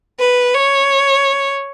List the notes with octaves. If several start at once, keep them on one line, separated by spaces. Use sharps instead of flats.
B4
C#5